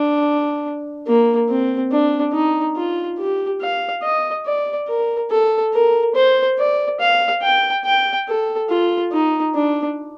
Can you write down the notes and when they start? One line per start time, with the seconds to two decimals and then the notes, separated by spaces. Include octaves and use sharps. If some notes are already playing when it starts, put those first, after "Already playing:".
Already playing: D4
1.07 A#3
1.49 C4
1.91 D4
2.33 D#4
2.76 F4
3.18 G4
3.61 F5
4.03 D#5
4.46 D5
4.88 A#4
5.31 A4
5.73 A#4
6.15 C5
6.58 D5
7.00 F5
7.42 G5
7.85 G5
8.28 A4
8.70 F4
9.12 D#4
9.55 D4